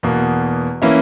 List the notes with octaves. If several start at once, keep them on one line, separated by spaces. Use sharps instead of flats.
E2 B2 A#3
E3 A#3 C#4 E4